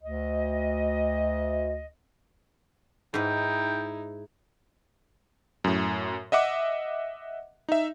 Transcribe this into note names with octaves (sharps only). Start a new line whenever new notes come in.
D2 D#5
G#2 D#4 E4 B4 G5
F#2 A2
D#5 E5 F#5 D6
D#4 E5